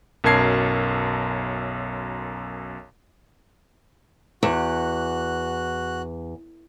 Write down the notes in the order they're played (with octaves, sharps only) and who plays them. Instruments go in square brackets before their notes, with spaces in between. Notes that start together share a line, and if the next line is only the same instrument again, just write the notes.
[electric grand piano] B1 F#2 A#4 A5 G#6 C7
[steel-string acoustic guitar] E2 [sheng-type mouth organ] F#4 F#6